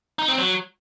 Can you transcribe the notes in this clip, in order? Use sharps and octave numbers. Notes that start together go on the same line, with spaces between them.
D#4
C4
F#3